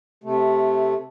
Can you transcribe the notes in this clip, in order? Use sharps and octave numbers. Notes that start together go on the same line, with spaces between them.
C3 A3